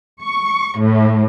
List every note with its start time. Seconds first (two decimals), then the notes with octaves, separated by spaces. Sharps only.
0.21 C#6
0.80 A2